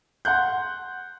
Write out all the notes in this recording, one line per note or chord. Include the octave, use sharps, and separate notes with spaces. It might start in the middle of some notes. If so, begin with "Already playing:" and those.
F#5 C6 F#6 G6